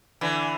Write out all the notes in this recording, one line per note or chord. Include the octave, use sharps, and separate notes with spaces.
D3 E3